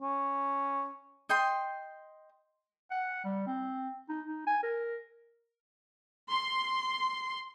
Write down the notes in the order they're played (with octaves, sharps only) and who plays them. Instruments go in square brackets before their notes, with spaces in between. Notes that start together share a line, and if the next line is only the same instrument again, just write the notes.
[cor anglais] C#4
[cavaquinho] D#5 G5 C6
[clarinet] F#5
G3
C4
D#4
D#4
G#5
A#4
[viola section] C6